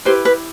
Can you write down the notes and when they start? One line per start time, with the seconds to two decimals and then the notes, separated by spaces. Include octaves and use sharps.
0.05 E4 G4 B4 C5
0.25 B4